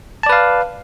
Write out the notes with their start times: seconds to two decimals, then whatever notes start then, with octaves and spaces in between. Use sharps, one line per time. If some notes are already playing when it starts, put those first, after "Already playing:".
0.23 A5
0.26 D5
0.29 B4
0.32 F5